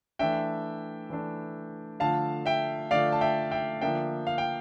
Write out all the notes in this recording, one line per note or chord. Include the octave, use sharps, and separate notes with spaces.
E3 A3 D4 E5 G5
E3 A3 D4
D3 F3 A3 F5 A5
E5 G5
D3 F3 A3 D5 F5
A5
E5 G5
E5 G5
D3 F3 A#3 D4 E5 G5
F5
G5